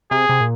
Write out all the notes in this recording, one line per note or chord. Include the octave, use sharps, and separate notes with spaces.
C3 G#4
C3
A#2